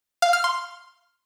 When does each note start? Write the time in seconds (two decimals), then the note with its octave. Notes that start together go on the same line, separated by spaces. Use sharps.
0.22 F5
0.33 F6
0.44 C6